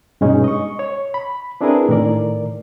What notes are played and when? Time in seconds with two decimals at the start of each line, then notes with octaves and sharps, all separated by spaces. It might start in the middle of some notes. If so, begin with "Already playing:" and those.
0.21 G2 B2 G#3 C#4 D#4
0.44 D#5 C#6
0.79 C#5
1.14 B5
1.61 C4 D4 E4 G#4 A#4 B4
1.89 A2 D#3 A#4 D5